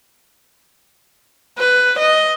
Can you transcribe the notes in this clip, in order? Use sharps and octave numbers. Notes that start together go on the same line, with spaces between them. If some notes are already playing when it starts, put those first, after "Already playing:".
B4
D#5